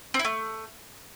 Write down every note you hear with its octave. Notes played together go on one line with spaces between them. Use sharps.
C4
E4
A3